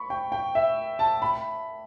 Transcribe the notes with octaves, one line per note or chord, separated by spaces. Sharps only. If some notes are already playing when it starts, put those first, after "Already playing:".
Already playing: B5 C#6
G5
G5
E5
A5
B5